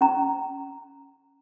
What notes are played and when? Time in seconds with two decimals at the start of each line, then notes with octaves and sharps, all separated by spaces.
0.01 C#4 A#5